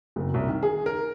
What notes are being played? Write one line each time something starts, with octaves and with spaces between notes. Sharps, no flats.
F#1
C2
D#3
G#4
A#4